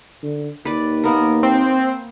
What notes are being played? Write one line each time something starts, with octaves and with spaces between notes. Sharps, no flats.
D3
D#2 B4 D5
A#3 B3 A#4
C4